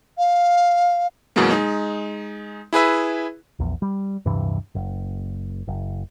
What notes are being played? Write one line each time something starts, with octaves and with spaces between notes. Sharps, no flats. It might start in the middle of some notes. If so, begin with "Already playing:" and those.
F5
F#2 B2 E3 F#3 G#3 A#3
G#3 D#4
E4 G#4 B4 E5
A#1 E2
G3
D1 G2 C3 E3
F#1
F#1